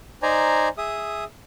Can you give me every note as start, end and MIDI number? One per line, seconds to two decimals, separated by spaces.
0.23 0.69 63
0.23 0.69 72
0.23 0.69 74
0.23 0.69 80
0.23 0.69 82
0.78 1.24 68
0.78 1.24 76
0.78 1.24 87